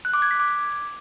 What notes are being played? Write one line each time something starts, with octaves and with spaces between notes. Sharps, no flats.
F#6
D6
G#6
B6
D6